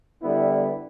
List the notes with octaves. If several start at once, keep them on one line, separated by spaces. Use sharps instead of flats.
D3 G3 B3 E4